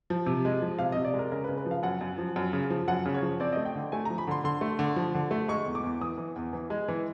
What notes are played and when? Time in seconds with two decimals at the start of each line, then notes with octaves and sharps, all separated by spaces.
0.10 F3
0.26 C3
0.45 G#3
0.62 F3
0.79 C3 F5
0.92 D#5
0.96 C3
1.05 D5
1.14 G#3
1.19 A#4
1.32 C#3 A#4
1.44 B4
1.48 C#3
1.57 B4
1.66 F3
1.71 F5
1.83 F#2 F#5
2.01 F#2
2.18 F3
2.36 F#2
2.53 C#3
2.70 F3
2.88 F#2 F#5
3.06 C#3
3.14 C#5
3.22 F3
3.40 C4 D5
3.52 D#5
3.57 A3
3.66 G5
3.75 D3
3.92 A3 G#5
4.05 A#5
4.10 F3
4.18 B5
4.27 D3 C6
4.44 D3 C6
4.61 A3
4.79 D3
4.96 F3
5.15 D3
5.31 A3
5.48 G#3 C#6
5.66 E2
5.75 D6
5.84 E2
6.01 E3 D#6
6.18 E3
6.36 E2
6.53 E3
6.70 G#3
6.88 E3